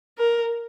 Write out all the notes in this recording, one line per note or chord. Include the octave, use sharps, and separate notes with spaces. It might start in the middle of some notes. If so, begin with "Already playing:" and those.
A#4